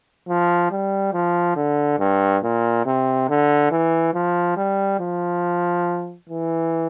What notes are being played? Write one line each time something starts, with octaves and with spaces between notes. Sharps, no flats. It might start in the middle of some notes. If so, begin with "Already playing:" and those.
F3
G3
F3
D3
G2
A#2
C3
D3
E3
F3
G3
F3
E3